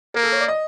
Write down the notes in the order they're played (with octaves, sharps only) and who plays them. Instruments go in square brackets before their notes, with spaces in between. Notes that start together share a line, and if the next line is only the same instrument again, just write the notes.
[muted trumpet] A#3 [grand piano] A#4
[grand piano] A4
C#5
D5
D#5